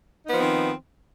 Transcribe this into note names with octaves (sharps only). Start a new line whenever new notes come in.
D#3 F3 B3 C4 D#4